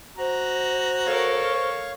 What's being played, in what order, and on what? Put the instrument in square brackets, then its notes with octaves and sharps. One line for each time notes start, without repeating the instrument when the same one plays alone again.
[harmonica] F#4 A#5 [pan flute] C5
[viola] A4 A#4 [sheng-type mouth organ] C#5 F5 C#6